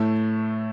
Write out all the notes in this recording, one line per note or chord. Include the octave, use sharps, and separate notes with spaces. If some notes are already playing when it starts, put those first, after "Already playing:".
Already playing: A2 A3